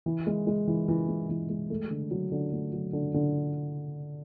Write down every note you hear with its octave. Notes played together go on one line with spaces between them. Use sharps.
E3
G#3
G#3
E3
E3
G#3
E3
G#3
A3
D3
F#3
D3
A3
F#3
D3
D3